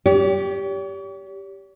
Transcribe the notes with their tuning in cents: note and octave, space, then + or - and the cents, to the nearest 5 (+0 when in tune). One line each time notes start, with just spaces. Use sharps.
G4 +0 C#5 +45